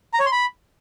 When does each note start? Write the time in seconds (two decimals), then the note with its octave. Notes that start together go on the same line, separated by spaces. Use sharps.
0.14 A#5
0.20 C#5
0.26 C6
0.32 B5